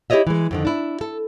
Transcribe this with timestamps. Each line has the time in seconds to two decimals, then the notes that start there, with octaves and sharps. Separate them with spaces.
0.10 E4 G4 A#4 C#5 D#5 E5
0.27 E3 G#3
0.51 F2 D3 D#3
0.65 D4 E4
1.01 A4